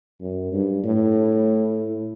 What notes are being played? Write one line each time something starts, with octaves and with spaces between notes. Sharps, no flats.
F#2
G2
A2